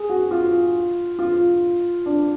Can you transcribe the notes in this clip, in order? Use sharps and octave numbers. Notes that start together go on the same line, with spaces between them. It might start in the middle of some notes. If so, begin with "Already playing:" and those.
Already playing: G#4
F#4
F4
F4
D4